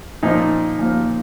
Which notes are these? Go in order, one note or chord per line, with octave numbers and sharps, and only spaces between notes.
A#2 F3 A#3 D#4
A#2 F3 A#3